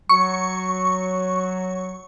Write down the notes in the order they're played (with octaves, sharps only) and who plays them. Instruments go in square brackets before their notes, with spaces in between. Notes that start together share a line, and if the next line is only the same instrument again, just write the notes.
[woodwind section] F#3 [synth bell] C#6